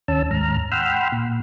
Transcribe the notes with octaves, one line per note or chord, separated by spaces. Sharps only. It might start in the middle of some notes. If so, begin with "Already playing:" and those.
D#2 C#4 A5 E6
D#2 G#2 A#5 F6
F#5 G5 B5 C6 E6 F6
A#2